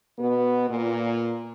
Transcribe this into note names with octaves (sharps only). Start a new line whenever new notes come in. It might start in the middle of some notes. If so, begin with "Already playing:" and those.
B2 B3
A#2